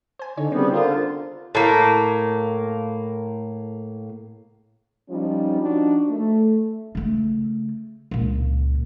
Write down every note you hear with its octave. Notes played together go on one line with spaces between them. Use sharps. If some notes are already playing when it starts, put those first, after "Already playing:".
C5 G#5
D3 D#4 C#5
C#3 G3 B3 C4 C5
D3 D4 F4 A4 A#4
A2 A#3
F3 G3 C#4 D#4
F3 D4 D#4 F#4
A3
C#3 A3
C#2 A#2